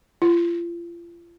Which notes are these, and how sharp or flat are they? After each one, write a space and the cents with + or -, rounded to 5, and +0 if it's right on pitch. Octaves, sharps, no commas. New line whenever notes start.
F4 -35